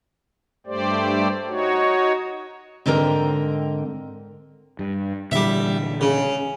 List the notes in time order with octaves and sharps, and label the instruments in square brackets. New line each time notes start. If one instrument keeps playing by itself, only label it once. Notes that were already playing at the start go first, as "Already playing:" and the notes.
[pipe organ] G2 A3 G4 C5 D5
D#4 F#4 C#5
[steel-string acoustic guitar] G#2 D3 C4 A#4 G5
[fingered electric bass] G2
[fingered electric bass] A#2 D3 E3 [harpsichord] G3 E5
[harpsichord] C#3